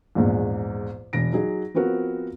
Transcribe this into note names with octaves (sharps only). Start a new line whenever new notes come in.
A#1 E2 G#2
E1 A#6 D7
F#3 D#4 G#4
F3 B3 C4 F#4 A#4